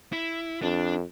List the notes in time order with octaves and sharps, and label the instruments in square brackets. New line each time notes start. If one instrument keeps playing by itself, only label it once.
[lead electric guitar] E4
[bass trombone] F2 [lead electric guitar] D4